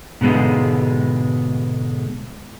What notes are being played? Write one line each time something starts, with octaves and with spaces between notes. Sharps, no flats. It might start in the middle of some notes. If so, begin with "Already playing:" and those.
G#2 B2 D3 G#3 B3